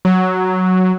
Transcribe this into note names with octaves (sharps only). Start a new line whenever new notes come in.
F#3